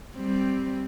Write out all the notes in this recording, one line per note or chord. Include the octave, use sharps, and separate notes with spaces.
G3 C4